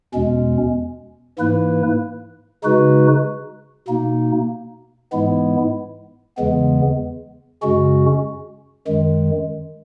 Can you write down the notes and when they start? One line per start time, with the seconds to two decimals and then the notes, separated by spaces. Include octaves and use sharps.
0.14 E2 B2 G#3 C#4
1.38 G#2 E3 A#3 E4 B4
2.64 C#3 G#3 D#4 F#4 B4
3.88 B2 A#3 D#4
5.13 G#2 E3 G#3 B3 E4
6.38 E2 C#3 E3 G#3 B3
7.62 F#2 C#3 G#3 C#4 F#4
8.87 F#2 D#3 G#3